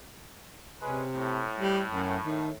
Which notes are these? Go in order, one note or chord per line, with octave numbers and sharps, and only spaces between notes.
C3 G#3 C#4 B4
A2
G3
F#2
D#3